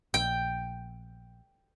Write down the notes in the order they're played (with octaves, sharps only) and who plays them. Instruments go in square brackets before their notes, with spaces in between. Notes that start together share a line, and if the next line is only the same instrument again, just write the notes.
[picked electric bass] A#1 [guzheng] G5